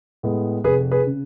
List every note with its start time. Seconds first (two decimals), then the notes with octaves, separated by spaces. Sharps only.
0.23 A2 G#3 B3
0.64 F1 G#4 B4
0.91 G#4 B4
1.07 C#3